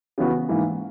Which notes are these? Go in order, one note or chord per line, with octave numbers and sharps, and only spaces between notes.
C#3 E3 B3 F#4
G#2 E3 A#3